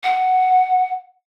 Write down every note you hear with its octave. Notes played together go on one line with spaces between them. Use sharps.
F#5